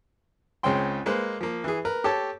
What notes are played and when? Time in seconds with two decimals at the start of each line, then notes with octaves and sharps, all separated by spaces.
0.63 C#2 G#3 C4 C#4 G5 C6
1.06 G#3 A#3 B4 C5
1.41 F3 A#3
1.64 E3 G#4
1.85 A#4 B4
2.04 G4 A4 C#5 A5